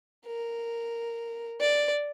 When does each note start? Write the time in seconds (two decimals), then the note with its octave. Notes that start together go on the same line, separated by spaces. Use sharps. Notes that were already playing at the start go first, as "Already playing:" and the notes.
0.26 A#4
1.61 D5